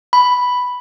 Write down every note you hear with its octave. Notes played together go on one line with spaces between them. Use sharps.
B5